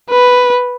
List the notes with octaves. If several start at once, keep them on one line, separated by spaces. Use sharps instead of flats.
B4